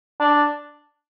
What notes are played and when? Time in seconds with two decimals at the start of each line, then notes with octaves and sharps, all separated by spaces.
0.20 D4